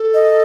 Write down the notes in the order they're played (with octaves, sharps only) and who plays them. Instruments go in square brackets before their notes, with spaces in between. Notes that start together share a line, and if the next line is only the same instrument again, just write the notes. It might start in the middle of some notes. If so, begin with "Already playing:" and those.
Already playing: [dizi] A4
[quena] D#5